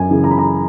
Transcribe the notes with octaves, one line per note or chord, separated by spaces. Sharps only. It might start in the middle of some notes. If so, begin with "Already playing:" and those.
Already playing: F#2 G#5
C#3 E3
A#5
B5
A#5